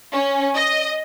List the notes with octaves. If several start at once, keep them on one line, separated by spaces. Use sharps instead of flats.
C#4
D#5